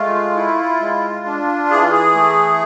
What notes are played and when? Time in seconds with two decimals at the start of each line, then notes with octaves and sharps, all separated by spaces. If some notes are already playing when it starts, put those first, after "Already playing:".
Already playing: G#3 A3 F4
0.36 E4
0.80 G#3
1.26 D4
1.70 E3 G#4
1.81 F4
1.91 G#4
2.15 A3